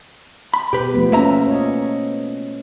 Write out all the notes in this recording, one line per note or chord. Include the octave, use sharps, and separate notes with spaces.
B5
B2 G4 B4
F3 A3 B3
A#3 C#4 A4 E5 A#5
C#5 D#5